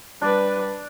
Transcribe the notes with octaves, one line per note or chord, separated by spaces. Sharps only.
G3 D4 B4 D5